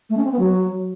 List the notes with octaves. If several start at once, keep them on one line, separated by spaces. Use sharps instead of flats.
A3
C#4
C4
B3
F#3